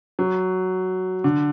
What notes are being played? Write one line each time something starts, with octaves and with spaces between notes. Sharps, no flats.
F#3
D3